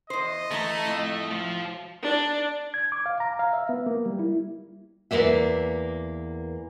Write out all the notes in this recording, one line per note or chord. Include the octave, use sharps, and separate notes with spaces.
E2 C5 D#5
E3 A3 A5 A#5
F2 A2
F3
D4
G#6
D6
F5
A#5
F5
E5
B3
A#3
G3
E4
E2 C#3 A#3 D5 E5